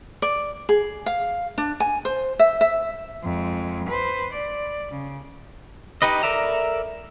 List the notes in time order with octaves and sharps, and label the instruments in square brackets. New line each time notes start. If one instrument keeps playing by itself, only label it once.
[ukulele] D5
G#4
F5
D4
G#5
C5
E5
E5
[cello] F2 G#3
B4 C5
D5
C#3
[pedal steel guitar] D#4 G4 B4 D#5
A4 A#4 D5 E5 A#5